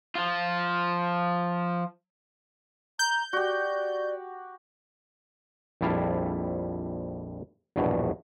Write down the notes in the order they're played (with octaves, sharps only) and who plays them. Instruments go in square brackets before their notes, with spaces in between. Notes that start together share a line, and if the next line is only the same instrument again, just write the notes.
[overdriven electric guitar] F3 F4
[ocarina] A#5 [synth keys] G6
[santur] F#4 G4 [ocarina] D5
[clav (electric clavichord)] A#1 F2 G3 E4 F5 A5
A#1 E2 G2 B2